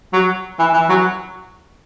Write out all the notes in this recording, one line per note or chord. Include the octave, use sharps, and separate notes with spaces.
F#3
E3
E3
F#3